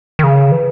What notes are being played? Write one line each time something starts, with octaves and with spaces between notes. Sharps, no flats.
D#3
C#3
E3